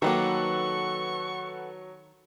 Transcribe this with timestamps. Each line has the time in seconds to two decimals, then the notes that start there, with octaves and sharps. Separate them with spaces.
0.02 D#3 F#3 G#3 A#3 A4 B4 F#5 C#6